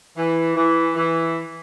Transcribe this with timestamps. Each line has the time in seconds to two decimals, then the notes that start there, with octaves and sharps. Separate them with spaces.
0.17 E3
0.57 E3
0.96 E3